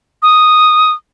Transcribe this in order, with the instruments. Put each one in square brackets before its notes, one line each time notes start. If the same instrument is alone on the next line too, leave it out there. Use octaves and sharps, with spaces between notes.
[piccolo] D#6